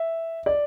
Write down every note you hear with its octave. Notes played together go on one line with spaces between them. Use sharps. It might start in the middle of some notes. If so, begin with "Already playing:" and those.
Already playing: E5
D5